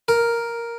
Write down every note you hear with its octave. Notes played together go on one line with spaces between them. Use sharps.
A#4